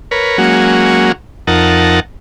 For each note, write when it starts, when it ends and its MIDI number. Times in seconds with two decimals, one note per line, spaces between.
0.11 0.38 70
0.11 0.38 71
0.11 0.38 73
0.38 1.12 54
0.38 1.12 56
0.38 1.12 58
0.38 1.12 61
0.38 1.12 66
1.47 2.00 41
1.47 2.00 63
1.47 2.00 70
1.47 2.00 78
1.47 2.00 81